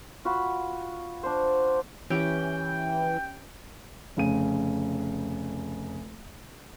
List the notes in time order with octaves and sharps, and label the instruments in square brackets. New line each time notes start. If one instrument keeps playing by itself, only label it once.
[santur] F4 F#4 B5
D4 C5
[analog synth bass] E3 [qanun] C#4 G4 [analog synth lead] G5
[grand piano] F1 C#3 D#7